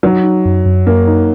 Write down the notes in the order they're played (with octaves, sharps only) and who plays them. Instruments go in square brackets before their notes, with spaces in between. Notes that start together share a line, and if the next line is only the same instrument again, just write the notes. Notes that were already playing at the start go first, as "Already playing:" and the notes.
[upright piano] F#3 [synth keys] D#4
[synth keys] D#4
F#2
F#2
[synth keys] F#2 [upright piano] A#3
[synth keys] D#4